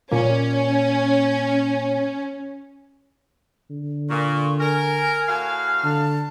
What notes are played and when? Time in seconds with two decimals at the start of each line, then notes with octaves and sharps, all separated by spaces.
0.12 A#2 A#3 C#4
3.71 D3
4.10 A#2 C#6
4.60 A#4 G#5
5.28 A2 F#4 F5
5.84 D3 A5